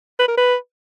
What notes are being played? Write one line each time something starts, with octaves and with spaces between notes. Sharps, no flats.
B4
A#4
B4